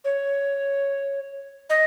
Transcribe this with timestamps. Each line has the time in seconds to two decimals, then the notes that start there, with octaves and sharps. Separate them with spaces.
0.05 C#5
1.70 D#5